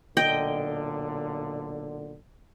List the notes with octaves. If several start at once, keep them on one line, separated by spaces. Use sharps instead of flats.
B1 A#2 D3 D#5 G5